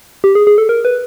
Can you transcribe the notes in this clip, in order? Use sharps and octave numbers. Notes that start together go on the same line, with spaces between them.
G4
G#4
G#4
A4
A#4
B4